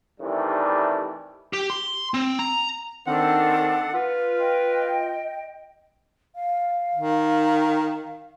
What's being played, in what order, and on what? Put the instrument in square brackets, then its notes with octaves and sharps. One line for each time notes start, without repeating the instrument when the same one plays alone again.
[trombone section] C3 D#3 E3 G3 A3 D4
[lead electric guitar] G4
C6
C4
A#5
[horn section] D#3 C4 [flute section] D4 A4 [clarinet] F#5
[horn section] F4 [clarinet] B4
[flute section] D#5 G5
[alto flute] F5
[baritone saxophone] D#3